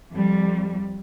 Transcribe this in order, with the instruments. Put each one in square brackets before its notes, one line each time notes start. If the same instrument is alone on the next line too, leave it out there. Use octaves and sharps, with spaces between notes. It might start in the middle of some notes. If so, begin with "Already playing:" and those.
[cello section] F2 G3